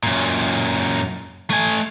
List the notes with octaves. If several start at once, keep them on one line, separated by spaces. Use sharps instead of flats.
F#2 A#2
A3 G#5